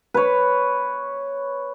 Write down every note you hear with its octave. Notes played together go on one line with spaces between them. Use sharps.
B4 C#5